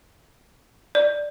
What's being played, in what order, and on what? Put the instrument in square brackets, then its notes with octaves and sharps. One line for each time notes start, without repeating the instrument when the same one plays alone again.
[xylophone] D5